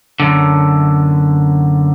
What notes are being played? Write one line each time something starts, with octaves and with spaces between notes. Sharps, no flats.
F#2 D3